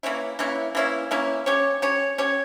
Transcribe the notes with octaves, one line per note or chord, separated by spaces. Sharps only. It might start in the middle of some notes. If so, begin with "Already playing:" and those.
E3 A#3 C#4 E4
E3 A#3 C#4 E4
E3 A#3 C#4 E4
E3 A#3 C#4 E4
C#4 G4 C#5
C#4 G4 C#5
C#4 G4 C#5